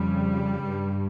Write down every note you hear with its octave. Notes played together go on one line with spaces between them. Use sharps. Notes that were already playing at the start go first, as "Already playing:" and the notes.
Already playing: F2 C#3 G3
G2